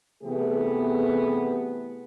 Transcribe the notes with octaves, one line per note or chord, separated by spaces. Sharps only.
C3 E3 A3 B3 G4 G#4